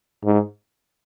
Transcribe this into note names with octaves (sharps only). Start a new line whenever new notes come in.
G#2